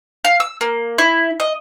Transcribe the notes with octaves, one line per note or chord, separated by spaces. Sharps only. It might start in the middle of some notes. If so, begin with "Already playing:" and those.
F5
E6
A#3
E4
D#5